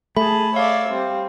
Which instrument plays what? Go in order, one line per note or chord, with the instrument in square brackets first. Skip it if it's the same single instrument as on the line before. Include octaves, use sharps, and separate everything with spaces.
[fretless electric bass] A3 [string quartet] G#4 A5 [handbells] B5
[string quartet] C#5 D5 E5 [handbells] F5
[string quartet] G3 C4